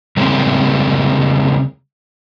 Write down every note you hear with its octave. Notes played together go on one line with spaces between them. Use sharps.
C#3 G3 G#3 A#3 C4 C#4